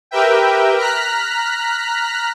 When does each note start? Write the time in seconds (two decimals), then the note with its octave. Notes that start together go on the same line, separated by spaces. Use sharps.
0.11 G4 A#4 B4 E5 G5
0.77 A#5 F6 F#6 B6